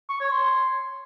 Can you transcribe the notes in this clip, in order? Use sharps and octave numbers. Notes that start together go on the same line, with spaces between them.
C#6
C#5
C6